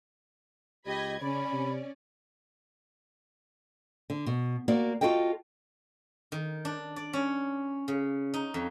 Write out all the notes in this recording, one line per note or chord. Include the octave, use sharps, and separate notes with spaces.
C#2 G4 D#5 B5 G#6
C#3 C#4 D5 B5
C3
D3
B2
A#3 F#4 D5
F4 F#4 A4 D#5 G5
D#3
D4
D5
C#4
C#3
D#4
F2